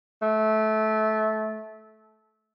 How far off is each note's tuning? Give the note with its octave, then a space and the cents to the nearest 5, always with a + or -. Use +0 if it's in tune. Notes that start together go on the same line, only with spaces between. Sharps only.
A3 -20